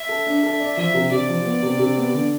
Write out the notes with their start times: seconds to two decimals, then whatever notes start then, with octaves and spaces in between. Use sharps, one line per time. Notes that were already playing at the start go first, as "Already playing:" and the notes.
Already playing: E5
0.09 A4
0.26 D4
0.43 A4
0.60 D5
0.77 F3 E5
0.94 C3
1.11 C3 D5
1.29 F3
1.45 B3
1.63 C3
1.79 C3
1.97 B3
2.14 D3